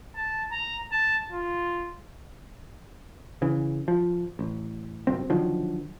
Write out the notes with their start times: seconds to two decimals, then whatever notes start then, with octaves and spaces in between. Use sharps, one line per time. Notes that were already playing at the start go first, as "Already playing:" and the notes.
0.16 A5
0.52 A#5
0.92 A5
1.32 F4
3.42 C#3 E3
3.88 F3
4.39 A1
5.07 G1 C2 F#2 C4
5.30 D3 D#3 F3 F#3